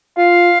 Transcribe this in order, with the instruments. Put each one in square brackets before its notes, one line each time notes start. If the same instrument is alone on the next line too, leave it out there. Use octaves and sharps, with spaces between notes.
[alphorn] F4 [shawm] F5